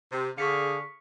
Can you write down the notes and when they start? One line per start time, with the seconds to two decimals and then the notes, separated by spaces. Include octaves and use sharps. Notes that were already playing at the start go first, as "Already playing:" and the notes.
0.12 C3
0.38 D3 G#4 F5 C#6 B6 C#7